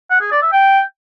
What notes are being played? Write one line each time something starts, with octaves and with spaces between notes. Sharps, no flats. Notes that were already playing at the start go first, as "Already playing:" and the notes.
F#5
G#4
D5
E5
G5